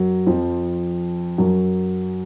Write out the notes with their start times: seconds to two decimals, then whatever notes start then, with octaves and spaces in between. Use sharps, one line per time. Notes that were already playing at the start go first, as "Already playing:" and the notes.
Already playing: F#2 F#3
0.26 F2 F3
1.38 F#2 F#3